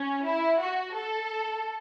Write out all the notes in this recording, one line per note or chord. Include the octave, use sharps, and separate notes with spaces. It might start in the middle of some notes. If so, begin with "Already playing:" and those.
Already playing: C#4
E4
F#4
A4